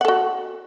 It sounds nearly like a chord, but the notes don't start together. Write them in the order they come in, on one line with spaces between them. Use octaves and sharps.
F#5 A4 F#4